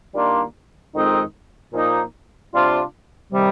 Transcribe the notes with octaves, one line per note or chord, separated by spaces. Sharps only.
D#3 G3 A#3 D4 F4
F2 D#3 G#3 C4 D#4
A#2 F3 A#3 D#4
C3 G3 D4 F4
C3 D#3 G3